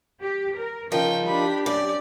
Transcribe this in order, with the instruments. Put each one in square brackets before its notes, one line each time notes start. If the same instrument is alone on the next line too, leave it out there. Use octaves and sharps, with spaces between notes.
[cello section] G4
A#4
[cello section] C#3 [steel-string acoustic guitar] F3 D#4 A#4 [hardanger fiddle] G5
[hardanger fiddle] D4 B5 [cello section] G4
[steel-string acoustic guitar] F#2 [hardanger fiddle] D5